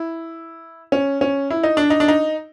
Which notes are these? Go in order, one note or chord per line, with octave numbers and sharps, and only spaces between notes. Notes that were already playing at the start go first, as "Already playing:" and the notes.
Already playing: E4
C#4
C#4
E4
D#4
D4
D#4
D4
D#4